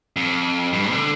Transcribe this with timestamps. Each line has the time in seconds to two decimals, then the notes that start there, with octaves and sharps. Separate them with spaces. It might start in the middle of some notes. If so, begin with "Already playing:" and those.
0.16 F2
0.73 G2
0.92 D3